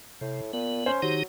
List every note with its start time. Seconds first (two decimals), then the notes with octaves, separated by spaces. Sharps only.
0.21 A2 C3
0.53 A#2 B3
0.86 C#4 C5
1.02 D#3 F#3 D#4 G4